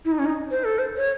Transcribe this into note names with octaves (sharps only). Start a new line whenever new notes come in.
E4
D#4
C#4
D#4
C5
A4
C5
C#5